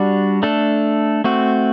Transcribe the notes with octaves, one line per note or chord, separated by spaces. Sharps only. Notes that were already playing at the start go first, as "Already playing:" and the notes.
Already playing: G3 D4 F#4
A3 D4 A4
A3 C4 F#4